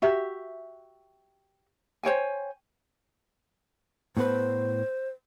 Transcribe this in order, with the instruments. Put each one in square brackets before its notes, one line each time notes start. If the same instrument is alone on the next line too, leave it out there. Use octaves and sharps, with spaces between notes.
[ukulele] F#4 G4 E5
C5 C#5 G5 G#5
[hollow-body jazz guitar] A2 B3 B4 [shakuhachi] C5